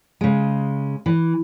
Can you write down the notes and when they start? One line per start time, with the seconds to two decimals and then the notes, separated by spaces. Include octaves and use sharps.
0.21 C#3 G#3
1.06 E3